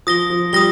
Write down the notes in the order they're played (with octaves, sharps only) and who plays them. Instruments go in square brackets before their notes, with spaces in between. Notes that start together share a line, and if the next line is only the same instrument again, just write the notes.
[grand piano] F3 [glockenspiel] D#6 A#6 G7
[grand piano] F3
[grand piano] G3 [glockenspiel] D#6 A#6 G7